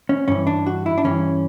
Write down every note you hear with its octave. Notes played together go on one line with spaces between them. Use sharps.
C#4
G2 E3 C#4
D4
F#4
E4
D4
G2 E3 C#4